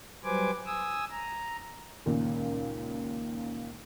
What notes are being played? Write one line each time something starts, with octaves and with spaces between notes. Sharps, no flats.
F#3 G3 B4 C5 G#5 D6
G#5 D#6 E6
A#5
C#2 A#2 D#3